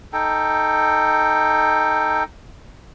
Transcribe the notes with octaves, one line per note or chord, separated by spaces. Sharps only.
D#4 A4 G5